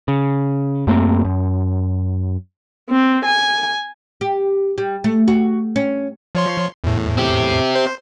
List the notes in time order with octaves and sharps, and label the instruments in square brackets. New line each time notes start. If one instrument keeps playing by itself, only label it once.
[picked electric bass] C#3
F#2 A3 A#3 C4
F#2
[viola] C4
G#5
[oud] G4
G3
A3
F#4
C#4
[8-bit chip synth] F3 C#5 C6
E2 A2
[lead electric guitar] C4 G4
[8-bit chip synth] C5